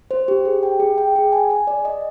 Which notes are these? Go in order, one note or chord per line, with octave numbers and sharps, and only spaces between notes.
C5
G4
G#4
G5
G#4
G5
G#4
G#5
G#5
D5
D#5